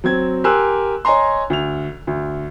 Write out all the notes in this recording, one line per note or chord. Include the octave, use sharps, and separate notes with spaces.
F#3 C4 G#6
G4 A#4 G#5 C6 E6 F#6
C#5 D#5 G#5 A#5 C6
D2 F7
D2